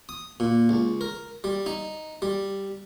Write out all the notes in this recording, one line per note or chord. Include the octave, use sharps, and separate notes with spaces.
D#6
A#2
C#2
A#4
G3
D#4
G3